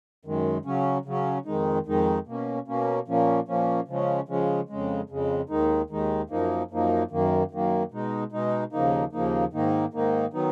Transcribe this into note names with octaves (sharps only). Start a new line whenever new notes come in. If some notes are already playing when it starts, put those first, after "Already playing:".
F#2 D#3 G#3
C#3 F#3 C#4
C#3 F#3 C#4
F2 D#3 G#3 D#4
F2 D#3 G#3 D#4
B2 A#3 C#4
B2 A#3 C#4
A#2 F3 A#3 C#4
A#2 F3 A#3 C#4
C#3 F3 G#3 C#4
C#3 F3 G#3 C#4
F2 C#3 G#3
F2 C#3 G#3
D#2 D#3 G#3 D#4
D#2 D#3 G#3 D#4
F#2 F3 A#3 D#4
F#2 F3 A#3 D#4
F#2 D#3 A#3
F#2 D#3 A#3
B2 G#3 D#4
B2 G#3 D#4
D#2 C#3 F3 A#3 D#4
D#2 C#3 F3 A#3 D#4
G#2 D#3 A#3 D#4
G#2 D#3 A#3 D#4
D#3 F#3 B3 D#4